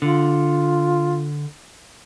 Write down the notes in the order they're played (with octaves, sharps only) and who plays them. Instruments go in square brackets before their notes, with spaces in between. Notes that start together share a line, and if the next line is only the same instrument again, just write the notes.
[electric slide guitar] D3 [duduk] F4